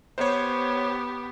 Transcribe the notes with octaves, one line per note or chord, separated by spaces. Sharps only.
B3 G4 C5 C#5